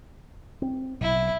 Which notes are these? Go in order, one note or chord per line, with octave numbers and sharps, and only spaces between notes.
C4
A#1 B2 F#3 E4